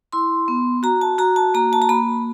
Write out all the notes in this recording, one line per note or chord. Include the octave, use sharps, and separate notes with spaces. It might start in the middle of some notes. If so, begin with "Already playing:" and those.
E4 C6
B3
F#4 A#5
A5
F#4 A#5
A5
A#3 A#5
A5
A#5
A#3 B5